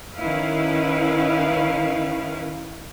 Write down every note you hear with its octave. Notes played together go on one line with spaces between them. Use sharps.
D#3 C#4 E4 B4 F5